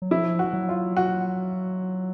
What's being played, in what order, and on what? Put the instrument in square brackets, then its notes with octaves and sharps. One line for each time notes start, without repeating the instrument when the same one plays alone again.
[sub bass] F#3
[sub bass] F3 [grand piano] E4
[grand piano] F#4
[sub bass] F3
F#3
[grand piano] F4
F#4